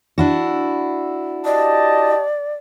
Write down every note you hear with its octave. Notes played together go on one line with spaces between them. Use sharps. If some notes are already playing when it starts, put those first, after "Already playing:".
D4 E4 F#4
G4 D5 D#5 A5